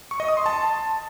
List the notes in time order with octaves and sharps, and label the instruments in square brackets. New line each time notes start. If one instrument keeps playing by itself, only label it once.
[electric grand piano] C#6
D#5
D#6
C6
A5